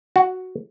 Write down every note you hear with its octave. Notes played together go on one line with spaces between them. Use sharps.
F#4